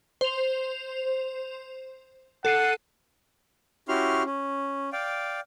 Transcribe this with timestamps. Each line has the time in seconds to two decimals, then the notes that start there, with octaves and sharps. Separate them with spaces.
0.21 C5 F7
2.45 A4 F#5 C7 D#7
3.88 C#4 E4 F#4 G4 C6 F6
4.25 C#4
4.93 D5 F5 G5